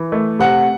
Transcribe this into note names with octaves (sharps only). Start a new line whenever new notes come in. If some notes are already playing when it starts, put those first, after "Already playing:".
Already playing: E3
A3
C3 F#5